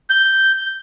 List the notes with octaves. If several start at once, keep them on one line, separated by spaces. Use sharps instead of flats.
G6